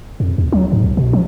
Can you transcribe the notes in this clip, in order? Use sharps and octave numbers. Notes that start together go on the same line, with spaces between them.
F2
D#2
F#3
G#2
C2
B2
F3